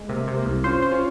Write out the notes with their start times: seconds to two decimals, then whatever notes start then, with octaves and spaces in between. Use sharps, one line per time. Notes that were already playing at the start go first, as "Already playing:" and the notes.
Already playing: G#3
0.09 C3 A#3
0.28 C3
0.37 A#3
0.46 C2
0.64 C#4 F4 C5
0.82 C5
0.91 C#4 F4